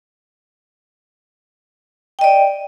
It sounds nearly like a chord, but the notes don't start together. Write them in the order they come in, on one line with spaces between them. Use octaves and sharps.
G5 D#5 D5